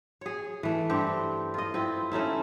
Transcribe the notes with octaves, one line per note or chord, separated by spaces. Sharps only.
G#4 C#5
E3 A3
G2 C4 G4
F4 D#5
C4 E4 F4
A3 C#4 D#4 E4